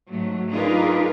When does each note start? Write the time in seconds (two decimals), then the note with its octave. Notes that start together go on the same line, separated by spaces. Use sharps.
0.11 G#2 F#3 A3
0.51 D4 D#4 F4 G#4 A#4 B4